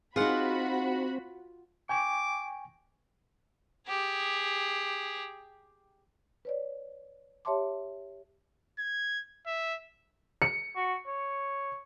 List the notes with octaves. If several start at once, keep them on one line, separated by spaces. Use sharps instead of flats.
C4 D#4 F4 F#4 G#4 F#5 B5
G5 G#5 C#6 D6
G4 G#4
B4 C#5 D5
G4 C#5 E5 A5 C6 D6
G#6
E5
C#7
F#4
C#5